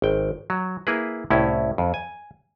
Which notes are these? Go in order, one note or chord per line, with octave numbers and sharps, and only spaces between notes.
G#1 G5
F#3
A#3 E4 G#4 B4
C2 A2 C#4 E4
F2
G#5